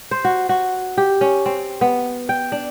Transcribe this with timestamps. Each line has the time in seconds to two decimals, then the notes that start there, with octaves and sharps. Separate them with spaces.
0.11 C5
0.25 F#4
0.49 F#4
0.97 G4
1.21 C#4
1.46 C4
1.81 B3
2.29 G5
2.52 D4